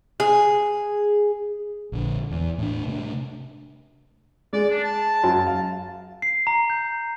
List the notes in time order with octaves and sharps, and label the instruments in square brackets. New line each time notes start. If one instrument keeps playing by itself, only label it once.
[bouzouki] G#4
[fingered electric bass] A#1 D3
E2
A2 D4
C3 A3 D4
[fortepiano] G#3 [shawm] D5
[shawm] D4
A5
[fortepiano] F#2
F5
[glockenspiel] C7
A#5
G6